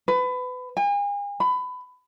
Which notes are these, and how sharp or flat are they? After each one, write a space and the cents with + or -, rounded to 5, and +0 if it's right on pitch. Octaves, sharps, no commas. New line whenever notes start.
B4 +25
G#5 -40
B5 +25